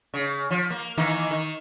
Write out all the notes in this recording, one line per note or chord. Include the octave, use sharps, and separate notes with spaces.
C#3
F3
A#3
D#3 E3 A#3
D#3